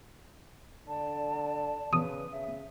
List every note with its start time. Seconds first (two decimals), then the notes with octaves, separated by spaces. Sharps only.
0.88 D3 D5 A5
1.93 C#3 B4 D#6
2.32 C#3 E5